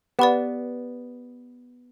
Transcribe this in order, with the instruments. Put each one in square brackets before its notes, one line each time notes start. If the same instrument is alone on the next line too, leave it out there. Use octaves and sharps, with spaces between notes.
[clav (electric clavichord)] B3 [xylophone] G4 B4 D5